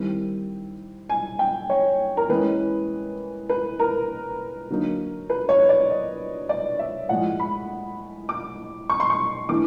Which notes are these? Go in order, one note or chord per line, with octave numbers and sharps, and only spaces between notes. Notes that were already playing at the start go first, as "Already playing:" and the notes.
Already playing: D#3 G3 C4 E4
G#5
G5
C#5
A#4
E3 G#3 C#4 B4
B4
A#4
D3 F#3 A#3 D#4
B4
C#5
D5
D#5
D5
E5
A2 F3 G#3 F#5
B5
D6
C#6
C6
C#6
E3 A3 D4 D6